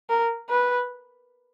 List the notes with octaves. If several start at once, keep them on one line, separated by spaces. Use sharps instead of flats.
A#4
B4